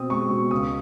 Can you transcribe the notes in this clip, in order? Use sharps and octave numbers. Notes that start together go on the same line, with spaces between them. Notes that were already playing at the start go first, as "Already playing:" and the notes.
Already playing: B2 C4 D#6
G#3 C#6
B2
C#2 D#6